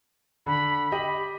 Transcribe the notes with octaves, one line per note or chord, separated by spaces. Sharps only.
D3 B5
G4 D#5 G5